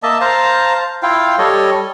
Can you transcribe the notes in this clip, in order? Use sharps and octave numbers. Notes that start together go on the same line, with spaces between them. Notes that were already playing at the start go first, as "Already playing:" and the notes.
A#3 D#5 E5 A5
C5 F5 A5 A#5
E4 F4 F5 G5
G3 A4 C#5 D#5